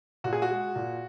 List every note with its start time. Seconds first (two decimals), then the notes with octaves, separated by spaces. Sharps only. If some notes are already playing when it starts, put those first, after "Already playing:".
0.24 A#2 F#4
0.33 G#4
0.42 F#4
0.50 G#3
0.76 A#2